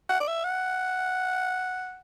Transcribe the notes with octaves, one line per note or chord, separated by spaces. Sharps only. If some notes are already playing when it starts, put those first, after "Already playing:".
F#5
D5
E5
F#5